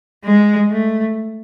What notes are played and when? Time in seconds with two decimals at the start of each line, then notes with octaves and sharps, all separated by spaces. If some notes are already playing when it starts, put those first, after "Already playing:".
0.24 G#3
0.70 A3